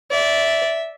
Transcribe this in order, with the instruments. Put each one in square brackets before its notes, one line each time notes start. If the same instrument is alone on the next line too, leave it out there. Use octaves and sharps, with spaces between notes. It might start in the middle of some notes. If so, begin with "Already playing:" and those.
[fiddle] D5 [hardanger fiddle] E5